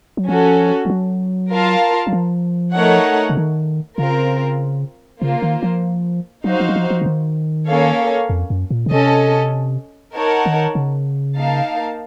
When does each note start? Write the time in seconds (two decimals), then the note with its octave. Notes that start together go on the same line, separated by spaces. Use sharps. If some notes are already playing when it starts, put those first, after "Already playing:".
0.17 F#3
0.29 F3 C#4 F#4 A4
0.85 F3
0.90 F#3
1.52 F4 A#4 F5 A5
2.07 F#3
2.13 F3
2.75 A3 D#4 A#4 C#5 F#5
3.30 C#3
3.37 D#3
3.98 C#3 C4 F4 A#4
5.21 C#3 A#3 F4 C5
5.42 D#3
5.63 F3
6.44 F#3 D#4 F#4 C5 F5
6.60 F3
6.69 F#3
6.76 F3
6.90 F3
7.01 C#3
7.06 D#3
7.68 A#3 C#4 A4 C#5 F5
8.30 F2
8.50 F#2
8.71 A#2
8.86 C#3
8.91 C3 C#4 A4 D#5
10.14 D#4 A#4 C#5 F#5 A5
10.46 D#3
10.75 C#3
11.38 A#3 D#4 A#4 F5 A5